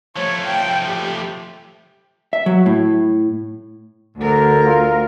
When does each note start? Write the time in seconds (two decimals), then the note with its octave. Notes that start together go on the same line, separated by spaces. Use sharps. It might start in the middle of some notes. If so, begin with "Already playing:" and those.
0.16 F3 A3 C#5
0.46 G5
0.88 G4
2.33 E5
2.46 F#3
2.66 A2
4.17 D2 D3 A#4
4.66 F4